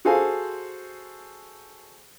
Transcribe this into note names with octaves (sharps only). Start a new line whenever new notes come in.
F#4 G#4 A4 C5 F5 G#5